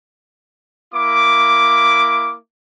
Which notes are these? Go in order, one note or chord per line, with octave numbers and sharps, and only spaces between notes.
A#3 E4 D6